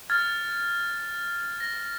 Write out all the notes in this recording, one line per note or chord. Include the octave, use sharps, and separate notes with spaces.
F6 G#6 A6
A#6